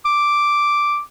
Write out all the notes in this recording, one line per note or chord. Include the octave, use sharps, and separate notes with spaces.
D6